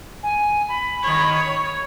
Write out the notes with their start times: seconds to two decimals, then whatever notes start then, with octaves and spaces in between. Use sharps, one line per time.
0.23 G#5
0.68 B5
1.03 D#3 C#5
1.32 C#5